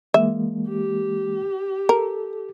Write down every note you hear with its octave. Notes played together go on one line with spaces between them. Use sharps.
E3 G#3 A#3 E5
G4
A4 A#4